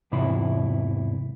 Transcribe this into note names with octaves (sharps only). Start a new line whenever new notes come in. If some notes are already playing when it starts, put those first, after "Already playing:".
E2 G#2 C3 E3 E4 B5